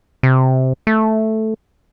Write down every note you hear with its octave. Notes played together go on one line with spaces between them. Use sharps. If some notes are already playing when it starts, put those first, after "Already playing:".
C3
A3